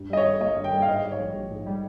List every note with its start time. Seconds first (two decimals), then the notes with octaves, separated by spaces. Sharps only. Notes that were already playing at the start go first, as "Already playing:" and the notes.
Already playing: G2
0.09 G3 D#5
0.17 C#5
0.25 G#1
0.40 A#3 D#5
0.56 G2
0.64 G5
0.72 G3
0.82 F5
0.88 G#2 D#5
1.03 G3
1.12 C#5
1.19 A#1
1.35 A#1
1.50 G#2
1.66 G3